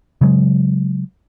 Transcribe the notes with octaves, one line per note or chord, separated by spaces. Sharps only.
C#3 F#3 G#3